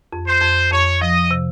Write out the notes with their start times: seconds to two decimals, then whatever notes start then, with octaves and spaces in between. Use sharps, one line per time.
0.12 F2
0.27 C5
0.42 F2
0.72 F2 C#5
1.01 F3 D#5
1.31 C3